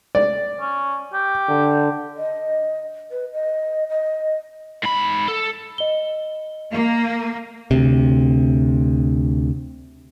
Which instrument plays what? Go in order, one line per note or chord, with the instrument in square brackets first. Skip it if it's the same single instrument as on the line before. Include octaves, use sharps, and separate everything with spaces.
[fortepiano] D5
[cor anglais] C#4
G4
[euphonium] D3
[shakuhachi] D#5
B4
D#5
D#5
[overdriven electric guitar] G#2 B5
A4
[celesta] D#5 G7
[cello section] A#3
[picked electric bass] D2 C3